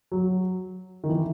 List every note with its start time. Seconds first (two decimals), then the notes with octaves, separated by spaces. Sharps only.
0.12 F#3
1.04 D#3
1.09 E3